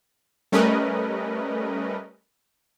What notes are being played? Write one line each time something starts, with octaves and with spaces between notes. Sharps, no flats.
G3 A3 C#4 A#4 B4 D#5